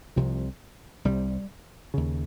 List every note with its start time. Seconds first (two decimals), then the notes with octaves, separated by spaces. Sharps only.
0.16 C2 C3 F3
1.05 C2 C3 G3
1.94 D#2 C#3